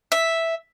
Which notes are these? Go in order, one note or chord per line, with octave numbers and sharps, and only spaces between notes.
E5